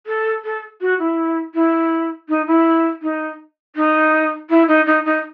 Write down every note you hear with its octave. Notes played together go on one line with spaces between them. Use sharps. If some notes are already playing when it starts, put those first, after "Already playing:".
A4
A4
F#4
E4
E4
D#4
E4
D#4
D#4
E4
D#4
D#4
D#4